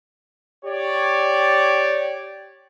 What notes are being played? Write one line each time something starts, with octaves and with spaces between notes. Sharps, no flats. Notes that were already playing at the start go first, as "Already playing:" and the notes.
G4 C#5 D5